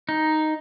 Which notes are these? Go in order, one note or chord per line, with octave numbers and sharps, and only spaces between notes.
D#4